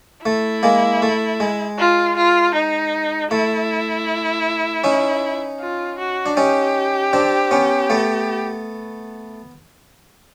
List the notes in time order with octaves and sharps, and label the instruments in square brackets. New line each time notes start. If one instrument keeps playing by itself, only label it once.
[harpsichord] A3 [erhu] E4
[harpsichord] G#3 A#3
A3
G#3
[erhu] F4
F4
D#4
[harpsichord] A3 [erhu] E4
[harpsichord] C#4 D#4
[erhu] F4
F#4
[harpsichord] D4
[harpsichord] C#4 D#4 [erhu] G4
[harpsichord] C4 D4
B3 C#4
A3 B3